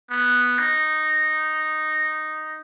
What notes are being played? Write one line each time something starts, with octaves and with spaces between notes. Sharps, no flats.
B3
D#4